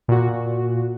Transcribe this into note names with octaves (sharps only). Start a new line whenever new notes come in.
A#2 F#4